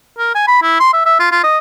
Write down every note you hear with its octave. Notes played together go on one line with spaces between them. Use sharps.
A#4
G#5
B5
E4
C6
E5
E5
F4
F4
D#5